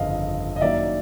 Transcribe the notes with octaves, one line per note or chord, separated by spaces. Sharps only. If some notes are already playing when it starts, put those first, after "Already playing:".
Already playing: G1 F2 C#3 D#5 F5
D#5
F#2 D#3 F#3 A#3 D5 E5